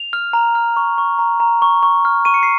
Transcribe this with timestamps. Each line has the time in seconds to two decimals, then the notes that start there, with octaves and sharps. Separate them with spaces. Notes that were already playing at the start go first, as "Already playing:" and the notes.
Already playing: F7
0.13 F6
0.33 A#5
0.55 F6
0.77 C#6
0.98 C#6
1.19 A#5
1.40 A#5
1.62 C#6
1.83 C#6
2.05 F6
2.25 C#6 D#7
2.34 C#7
2.43 C7